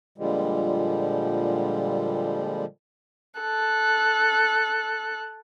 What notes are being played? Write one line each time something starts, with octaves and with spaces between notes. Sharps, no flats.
A#2 D3 F3 G3 G#3
A4 F#6